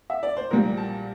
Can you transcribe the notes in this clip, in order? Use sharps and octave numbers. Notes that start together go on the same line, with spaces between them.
E5
D5
C5
A#1 A#2 G3 A#4
A5